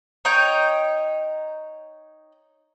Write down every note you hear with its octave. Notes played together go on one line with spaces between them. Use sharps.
D#4 C#5 G5